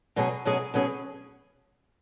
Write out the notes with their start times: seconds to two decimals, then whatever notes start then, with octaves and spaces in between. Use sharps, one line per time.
0.16 B2 F#3 C#4 G#4
0.45 B2 F#3 C#4 G#4
0.74 B2 F#3 C#4 G#4